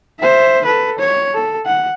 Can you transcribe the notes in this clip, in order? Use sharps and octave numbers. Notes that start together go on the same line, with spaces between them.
C5 E5
A4 B4
C#5
A4
F#5